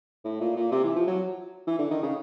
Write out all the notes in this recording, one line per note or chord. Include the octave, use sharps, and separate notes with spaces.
A2
A#2
A#2
C3
E3
F3
F#3
E3
D3
D#3
C#3